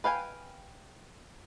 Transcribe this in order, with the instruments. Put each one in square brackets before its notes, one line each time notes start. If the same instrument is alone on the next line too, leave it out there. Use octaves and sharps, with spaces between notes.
[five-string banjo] B4 F5 G5 G#5